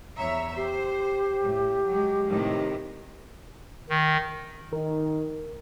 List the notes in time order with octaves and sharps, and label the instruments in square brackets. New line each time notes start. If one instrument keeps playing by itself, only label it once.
[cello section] E2 C#5 E5 [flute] A#5
[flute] G4 [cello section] C5
[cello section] A2
F#3 G#3
A2 C3 D#3
[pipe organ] D#3
[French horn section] D#3 [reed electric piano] A#4